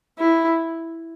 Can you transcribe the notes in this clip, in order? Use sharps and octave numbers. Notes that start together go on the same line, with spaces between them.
E4